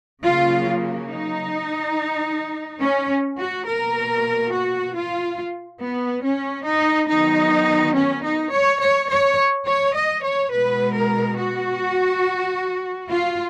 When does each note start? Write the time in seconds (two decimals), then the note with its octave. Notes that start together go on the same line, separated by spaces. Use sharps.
0.23 C#3 F#3 A#3 F4
1.09 D#4
2.81 C#4
3.37 F#4
3.67 B2 A#3 A#4
4.52 F#4
4.95 F4
5.81 B3
6.24 C#4
6.66 D#4
7.09 D#3 F#3 B3 D#4
7.95 C#4
8.24 D#4
8.53 C#5
8.81 C#5
9.10 C#5
9.67 C#5
9.95 D#5
10.24 C#5
10.52 B2 G#3 B3 B4
10.95 A#4
11.37 F#4
13.09 F4